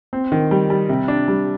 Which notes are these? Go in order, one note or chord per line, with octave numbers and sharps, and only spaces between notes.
C4
D#3
G3
G3
C3
D4
G3